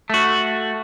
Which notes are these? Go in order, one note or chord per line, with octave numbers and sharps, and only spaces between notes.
A3 F#4